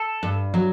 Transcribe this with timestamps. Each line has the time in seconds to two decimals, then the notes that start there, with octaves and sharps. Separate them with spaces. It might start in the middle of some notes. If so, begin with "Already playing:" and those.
Already playing: A4
0.23 G2
0.54 F#3